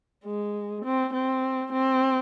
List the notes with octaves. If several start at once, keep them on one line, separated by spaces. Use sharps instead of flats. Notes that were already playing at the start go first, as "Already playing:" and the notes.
G#3
C4
C4
C4